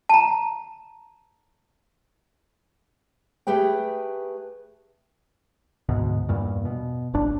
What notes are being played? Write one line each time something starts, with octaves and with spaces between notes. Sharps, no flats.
A5 A#5
A3 G4 G#4 B4 G5
D2 G#2 B2
E2 G2 A#2
B2
E1 A1 D4